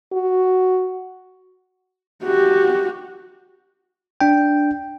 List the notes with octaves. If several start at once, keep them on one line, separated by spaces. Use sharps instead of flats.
F#4
F#4 G4
D4 G5